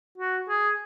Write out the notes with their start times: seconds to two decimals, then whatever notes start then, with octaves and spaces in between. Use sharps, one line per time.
0.18 F#4
0.49 G#4